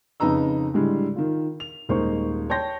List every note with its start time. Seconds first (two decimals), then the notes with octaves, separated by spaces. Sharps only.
0.20 F2 C#3 D#4 B4 A#5 E6
0.74 A2 D3 G3 G#3
1.16 D#3 F4
1.60 F7
1.89 D#1 G#3 A#3 D#4 C5 C#6
2.50 C#5 G5 A5 C6 G6 A#6